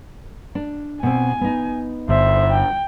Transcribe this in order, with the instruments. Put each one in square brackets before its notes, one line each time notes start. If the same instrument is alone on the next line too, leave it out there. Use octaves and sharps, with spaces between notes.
[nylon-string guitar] D4
[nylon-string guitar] B2 C4 [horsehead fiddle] G#5
[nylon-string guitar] B3 D#4
[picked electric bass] G1 [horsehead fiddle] C5 [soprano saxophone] E5
[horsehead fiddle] G5